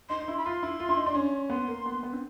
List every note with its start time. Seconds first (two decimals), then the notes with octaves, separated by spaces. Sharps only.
0.10 D#4 C6
0.22 D#4
0.28 E4
0.38 B5
0.45 F4 C6
0.63 E4
0.80 F4
0.89 E4
0.97 D#4
1.06 D4
1.15 C#4
1.50 B3 C6
1.68 A#3
1.86 B3
2.03 B3
2.13 C4